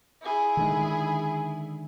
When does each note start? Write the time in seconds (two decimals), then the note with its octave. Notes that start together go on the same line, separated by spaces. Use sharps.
0.22 E4 G#4
0.57 D3 D#3 G#3